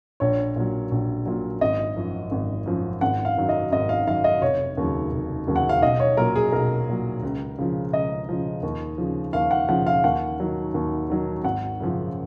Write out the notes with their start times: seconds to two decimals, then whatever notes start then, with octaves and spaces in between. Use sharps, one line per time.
0.20 A#1 C#5
0.56 A#2 F#3
0.92 A#1
1.26 A#2 F#3
1.61 G#1 D#5
1.96 F#2 F3
2.31 G#1
2.66 F#2 F3
3.01 G#1 F#5
3.25 F5
3.37 F#2 D#3 F#3
3.49 D#5
3.72 G#1 D#5
3.89 F5
4.06 F#2 D#3 F#3 F5
4.24 D#5
4.42 F1 C#5
4.77 D#2 C#3 F#3
5.12 F1
5.47 D#2 C#3 F#3
5.56 F#5
5.69 F5
5.82 B1 D#5
6.00 C#5
6.17 A#2 F#3 A#4
6.36 G#4
6.52 B1 A#4
6.88 A#2 F#3
7.23 C#2
7.58 C#3 F3
7.93 C#2 D#5
8.29 C#3 F3
8.63 D#2
8.98 C#3 F3
9.33 D#2 F5
9.51 F#5
9.68 C#3 F3 F#5
9.87 F5
10.04 D#2 F#5
10.40 D#3 F#3
10.74 D#2
11.10 D#3 F#3
11.44 G#1 F#5
11.80 F#2 C#3 F3